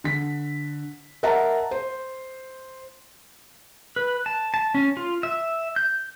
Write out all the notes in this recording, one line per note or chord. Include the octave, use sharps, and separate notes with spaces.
D3 B6
A#4 D#5 E5 F#5 A5 A#5
C5
B4
A5
A5
C#4
F4
E5
G6